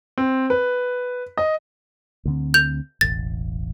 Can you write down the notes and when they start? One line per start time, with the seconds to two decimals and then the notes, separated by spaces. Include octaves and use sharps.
0.18 C4
0.50 B4
1.38 D#5
2.25 D2 D3 C4
2.54 G6 F7
3.01 E1 A1 A6